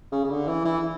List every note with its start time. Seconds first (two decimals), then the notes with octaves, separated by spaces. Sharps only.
0.12 C#3
0.24 C#3
0.30 D3
0.47 E3
0.65 E3